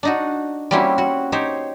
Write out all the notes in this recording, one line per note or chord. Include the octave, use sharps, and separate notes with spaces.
D4 D#4 F#4
G3 A#3 C4 C#4 E4 F#4
F#4
D#4 G4 C5 C#5